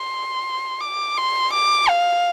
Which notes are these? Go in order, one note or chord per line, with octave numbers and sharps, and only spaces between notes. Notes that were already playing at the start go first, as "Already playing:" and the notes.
Already playing: C6
D6
C6
D6
F5